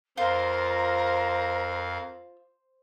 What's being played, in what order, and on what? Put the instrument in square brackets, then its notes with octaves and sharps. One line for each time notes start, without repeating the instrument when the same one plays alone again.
[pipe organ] F2 F5 [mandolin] F4 [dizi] A#4 [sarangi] C5